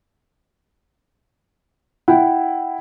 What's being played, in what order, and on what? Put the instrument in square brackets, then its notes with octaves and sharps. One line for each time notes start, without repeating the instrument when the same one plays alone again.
[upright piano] E4 [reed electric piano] F#5 G5